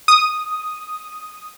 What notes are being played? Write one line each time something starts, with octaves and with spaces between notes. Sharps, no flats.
D#6